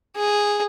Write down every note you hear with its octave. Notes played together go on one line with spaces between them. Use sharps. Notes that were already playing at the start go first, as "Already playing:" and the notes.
G#4